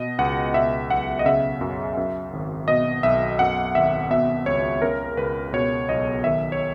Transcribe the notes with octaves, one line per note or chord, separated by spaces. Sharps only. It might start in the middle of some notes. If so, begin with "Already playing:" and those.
Already playing: B2 D#5
C#2 F#5
B2 E5
B1 F#5
D#5
C#3 E5
F#2
F#2
G#1
B2 D#5
B1 E5
F#2 F#5
G#1 E5
B2 E5
C#2 C#5
C#3 A#4
C#2 B4
B2 C#5
B1 D#5
D#3 E5
C#5